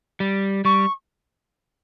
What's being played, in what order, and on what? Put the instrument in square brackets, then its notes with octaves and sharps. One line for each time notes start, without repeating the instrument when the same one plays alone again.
[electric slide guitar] G3
[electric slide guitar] G3 [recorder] C#6